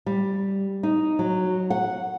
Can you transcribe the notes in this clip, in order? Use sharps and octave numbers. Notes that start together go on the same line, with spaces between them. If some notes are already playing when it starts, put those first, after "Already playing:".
G3
D#4
F#3
F#5